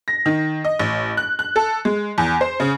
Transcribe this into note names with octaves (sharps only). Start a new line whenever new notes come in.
A#6
D#3
D#5
A1
F#6
F#6
A4
G#3
E2
C5
C#3